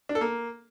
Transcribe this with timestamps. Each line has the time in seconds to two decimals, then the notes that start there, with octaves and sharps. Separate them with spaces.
0.09 D4
0.15 A4
0.21 A#3